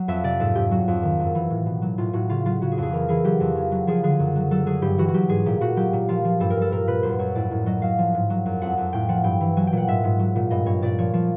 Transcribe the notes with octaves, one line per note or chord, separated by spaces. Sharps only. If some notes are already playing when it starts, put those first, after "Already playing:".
Already playing: F#3
F2 E5
C3 D5
G#2 A4
G#2 G4
F#3 F#4
F2
D#3
F#2
E3
A2
B2
F#3
A2 F4
A2 F#4
C#3 F4
F#3 F4
C#3 F#4
G#4
F2
G#4
E3 A#4
E3 G#4
F#3 G4
F2
C#3
F#3
F3 G#4
D3 G#4
F#2
F#3
F#3 A4
F#3 G#4
G2 G4
E3 F#4
F#4
F#3 G4
G#2 G#4
A#2 G4
A#2 F#4
F#3 G4
A#2
F3 F4
F3
G2 A4
A#4
G2 A4
A#2 A#4
A#2 B4
F#2 C5
F#2 C#5
A2 D5
A2
F#3 D#5
F#3 F5
F3
G#2
F#3
F#2
F2 F#5
F2
A2 G5
F3 F#5
G2 G5
E3
F#3 G#5
G5
A#2 F#5
G#2 E5
G#2
F#3
A#2
G2 D#5
G2 C#5
A#2 D5
F3 C#5
F3